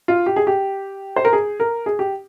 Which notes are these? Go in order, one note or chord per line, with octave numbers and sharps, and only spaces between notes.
F4
G4
G#4
G4
C5
A#4
G#4
A#4
G#4
G4